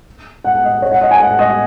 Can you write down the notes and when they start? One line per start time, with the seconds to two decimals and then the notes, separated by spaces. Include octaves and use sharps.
0.44 F#5
0.64 D#5
0.82 C#5
0.92 F#5
1.01 D#5
1.11 G#5
1.20 F#5
1.39 D#5